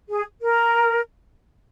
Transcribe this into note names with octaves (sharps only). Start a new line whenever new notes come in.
G#4
A#4